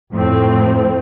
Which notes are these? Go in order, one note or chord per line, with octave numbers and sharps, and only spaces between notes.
F2 A2 C4